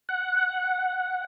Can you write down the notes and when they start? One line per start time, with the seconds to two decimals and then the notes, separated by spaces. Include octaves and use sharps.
0.09 F#5